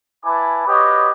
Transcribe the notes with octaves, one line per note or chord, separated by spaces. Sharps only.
E4 B4 G#5 A5 B5 D6
F#4 G4 B4 C#5 D#5